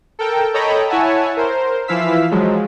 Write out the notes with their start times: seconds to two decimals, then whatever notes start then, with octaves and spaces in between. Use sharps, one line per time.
0.19 A4 A#4 G5
0.54 A4 C#5 D#5 G5 A#5 B5
0.89 E4 C#5 E5 F#5 G#5 A5
1.37 A#4 C5
1.88 E3 F3 E4 F5 E6 B6
2.31 F3 F#3 G#3